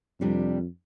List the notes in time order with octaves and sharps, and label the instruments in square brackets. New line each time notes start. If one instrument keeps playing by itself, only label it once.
[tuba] F2 [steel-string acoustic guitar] C3 G3 D4